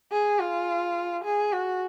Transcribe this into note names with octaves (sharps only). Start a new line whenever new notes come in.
G#4
F4
G#4
F#4